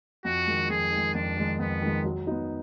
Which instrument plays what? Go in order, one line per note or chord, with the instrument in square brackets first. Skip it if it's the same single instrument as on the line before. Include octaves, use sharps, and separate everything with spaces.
[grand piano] F2 [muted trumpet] F#4
[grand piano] D#3 G#3
[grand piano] F2 [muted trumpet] G#4
[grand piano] D#3 G#3
[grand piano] F2 [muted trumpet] D4
[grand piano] D#3 G#3
[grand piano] F2 [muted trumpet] B3
[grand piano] D#3 G#3
F#3
B3 D#4